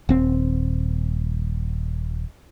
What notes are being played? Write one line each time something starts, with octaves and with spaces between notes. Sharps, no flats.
D#1 C4